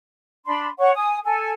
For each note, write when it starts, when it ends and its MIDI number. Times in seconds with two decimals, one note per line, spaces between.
0.46 0.67 62
0.46 0.67 83
0.46 0.67 84
0.79 0.91 73
0.79 0.91 78
0.79 0.91 85
0.95 1.17 80
0.95 1.17 87
1.24 1.51 69
1.24 1.51 80